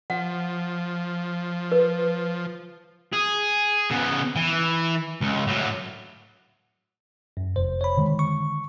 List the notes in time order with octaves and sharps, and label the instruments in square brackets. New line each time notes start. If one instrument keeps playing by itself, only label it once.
[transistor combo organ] F3 [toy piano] F#5
[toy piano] B4
[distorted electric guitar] G#4
C#3 B3
E3
C#2
A2 F#3
[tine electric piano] F#2
[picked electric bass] F1 [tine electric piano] C5
[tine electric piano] C#5 B5
[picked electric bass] D3 D#3 G#3
[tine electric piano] C#6